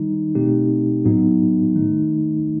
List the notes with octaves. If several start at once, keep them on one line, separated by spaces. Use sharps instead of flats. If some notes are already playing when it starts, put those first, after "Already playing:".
Already playing: D#3 G3 D#4
B2 A3 C4 D#4 G4
A2 F#3 B3 D#4 F#4
D#3 A3 D#4